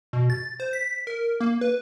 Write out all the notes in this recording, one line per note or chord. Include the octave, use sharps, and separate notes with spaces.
B2
A6
C5
B6
A#4
A#3
B4